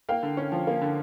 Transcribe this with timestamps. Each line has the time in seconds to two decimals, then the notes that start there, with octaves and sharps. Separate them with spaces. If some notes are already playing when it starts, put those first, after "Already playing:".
0.09 A#3 F5 G5
0.23 D3
0.37 C#4
0.52 F3
0.67 A#3
0.82 D3